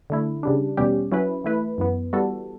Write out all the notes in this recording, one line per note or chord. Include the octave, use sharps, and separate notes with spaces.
D3 A3 E4
C#3 G3 D4
E2 B2 G3 C#4 G4
F#3 C#4 E4 B4
E3 A3 E4 B4
F#2 E3 B3
E3 G3 B3 F#4 A4